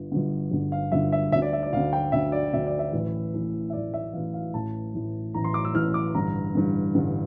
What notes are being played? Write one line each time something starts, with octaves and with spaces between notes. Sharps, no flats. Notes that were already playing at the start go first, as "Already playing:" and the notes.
Already playing: G1 G2 D3
G1 G2 D3
G1 G2 D3
F5
G1 G2 D3 E5
E5
D2 D3 E5
D5
E5
D5
D2 D3 F5
G5
D2 D3 E5
D5
D2 D3 E5
D5
E5
A1 A2 E3
A1 A2 E3
E5
A1 A2 E3 D5
E5
A1 A2 E3 F5
F5
A1 A2 E3 A5
A1 A2 E3
A1 A2 E3 A#5
C6
D6
E6
A1 A2 E3 F6
D6
A1 G2 D3 A#5
A1 G2 D3
A1 G2 D3